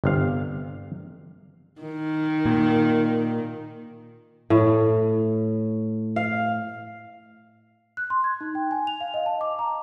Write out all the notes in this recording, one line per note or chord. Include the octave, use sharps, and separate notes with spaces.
G1 C3 F5
D#3
A#2
A2
F5
F#6
C6
G#6
D#4
G5
G#5
F7
F5
D#5
A5
D6
A#5